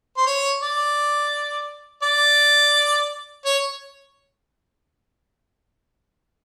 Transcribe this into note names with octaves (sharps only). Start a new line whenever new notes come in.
C5
C#5
D5
D5
C#5